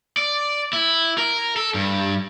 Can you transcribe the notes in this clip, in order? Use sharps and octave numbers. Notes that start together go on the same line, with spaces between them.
D5
E4
A#4
A4
G2